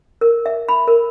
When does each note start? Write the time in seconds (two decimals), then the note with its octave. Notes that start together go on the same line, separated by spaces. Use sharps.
0.21 A#4
0.46 E5
0.69 B5
0.87 A#4